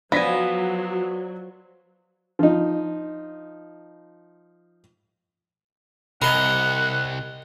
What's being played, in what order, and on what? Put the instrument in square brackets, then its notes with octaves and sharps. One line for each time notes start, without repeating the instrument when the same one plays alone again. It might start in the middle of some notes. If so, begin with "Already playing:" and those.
[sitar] F3 [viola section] F#3 [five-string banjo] B3 G#5 [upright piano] D5 A#6 B6
[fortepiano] F3 D#4
[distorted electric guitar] C2 C3 [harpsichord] A#4 D#5 [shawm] F#5 [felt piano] B5